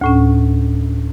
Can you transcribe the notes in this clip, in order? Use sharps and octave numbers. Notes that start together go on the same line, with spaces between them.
D2 A2 C#4